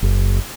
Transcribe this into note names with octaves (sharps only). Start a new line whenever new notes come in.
F#1